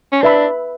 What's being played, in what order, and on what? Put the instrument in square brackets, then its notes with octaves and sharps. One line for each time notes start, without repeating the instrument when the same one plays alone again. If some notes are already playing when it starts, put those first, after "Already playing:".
[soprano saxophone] C#4
[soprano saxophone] D4 [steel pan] B4 E5 B5